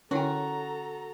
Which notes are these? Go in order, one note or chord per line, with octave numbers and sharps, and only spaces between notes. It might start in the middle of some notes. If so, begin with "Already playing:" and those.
D3 C#4 E4 F#4 A4 G5 A#5